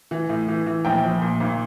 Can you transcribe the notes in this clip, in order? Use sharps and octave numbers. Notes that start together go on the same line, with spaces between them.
E3
A2
E3
E3
A#1 G5
F3
A#2
G#1